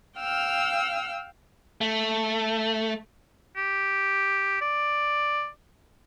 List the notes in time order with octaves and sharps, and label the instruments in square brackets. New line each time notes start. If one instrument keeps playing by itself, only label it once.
[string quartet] F5 G5 E6 F6
[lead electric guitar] A3
[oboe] G4
D5